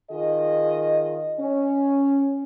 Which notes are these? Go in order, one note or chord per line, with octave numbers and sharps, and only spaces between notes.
D#3 F4 G#4 D#5
C#4